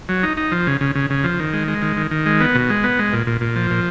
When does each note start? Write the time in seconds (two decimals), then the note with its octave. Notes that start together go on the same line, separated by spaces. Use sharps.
0.09 F#3
0.23 D#4
0.37 D#4
0.52 F3
0.67 C#3
0.81 C#3
0.95 C#3
1.10 C#3
1.24 F3
1.40 D#3
1.53 G#3
1.68 G#3
1.82 D#3
1.97 D#3
2.11 D#3
2.26 G#3
2.40 B3
2.55 B2
2.70 G#3
2.84 B3
2.99 G#3
3.13 A#2
3.27 A#2
3.41 A#2
3.56 F3
3.71 A#2